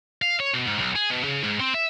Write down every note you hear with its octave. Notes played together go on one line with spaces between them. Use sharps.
F5
C#5
B2
G#2
B1
G#4
B2
C#3
G#2
C4
E5